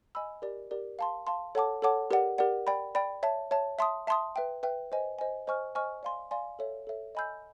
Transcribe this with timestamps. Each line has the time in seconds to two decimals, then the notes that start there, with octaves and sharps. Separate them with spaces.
0.15 D#5 G#5 B5 E6
0.42 G4 A#4 D5
0.71 G4 A#4 D5
0.99 F5 A5 C6
1.27 F5 A5 C6
1.55 A4 C#5 F#5 A5 D6
1.82 A4 C#5 F#5 A5 D6
2.11 G4 A#4 D5 F#5
2.38 G4 A#4 D5 F#5
2.67 D5 G5 B5
2.95 D5 G5 B5
3.23 C#5 E5 A5
3.51 C#5 E5 A5
3.79 E5 A5 C6 D#6
4.07 E5 A5 C6 D#6
4.36 B4 E5 G5
4.63 B4 E5 G5
4.92 C5 D#5 G#5
5.19 C5 D#5 G#5
5.47 C5 D#5 G#5 C#6 F6
5.75 C5 D#5 G#5 C#6 F6
6.03 D5 F5 G#5 C6
6.31 D5 F5 G#5 C6
6.59 A4 C#5 E5
6.87 A4 C#5 E5
7.15 D#5 G#5 B5 E6 G6